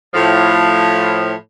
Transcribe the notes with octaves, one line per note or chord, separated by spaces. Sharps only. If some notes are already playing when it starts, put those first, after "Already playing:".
A2 F3